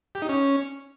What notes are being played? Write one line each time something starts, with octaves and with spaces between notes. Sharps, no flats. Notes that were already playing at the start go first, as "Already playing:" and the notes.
G4
D#4
C#4